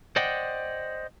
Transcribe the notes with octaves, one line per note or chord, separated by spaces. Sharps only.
C5 D5 D#5 F#5 G5